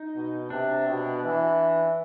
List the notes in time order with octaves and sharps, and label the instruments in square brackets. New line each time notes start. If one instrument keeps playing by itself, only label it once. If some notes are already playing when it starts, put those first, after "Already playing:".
Already playing: [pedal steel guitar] D#4
[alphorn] B2
[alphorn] C3 [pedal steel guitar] D4
[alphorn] B2
E3